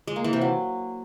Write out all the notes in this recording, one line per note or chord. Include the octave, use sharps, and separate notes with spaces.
G#3
A#3
E3
C3
F#3